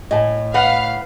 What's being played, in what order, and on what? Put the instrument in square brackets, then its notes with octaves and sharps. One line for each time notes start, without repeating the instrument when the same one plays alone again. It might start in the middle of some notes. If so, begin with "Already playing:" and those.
[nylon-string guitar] A2 [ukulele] D#5 G#5 A5
[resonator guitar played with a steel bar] B4 F#5 [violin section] F5